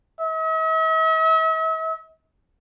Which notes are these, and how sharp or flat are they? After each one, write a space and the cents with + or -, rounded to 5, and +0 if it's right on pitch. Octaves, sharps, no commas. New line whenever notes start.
E5 -45